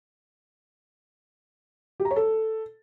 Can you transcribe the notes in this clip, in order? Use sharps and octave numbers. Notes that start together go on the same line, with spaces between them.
G4
A#5
C#5
A4